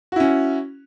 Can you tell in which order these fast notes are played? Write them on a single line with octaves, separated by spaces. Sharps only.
F#4 E4 C#4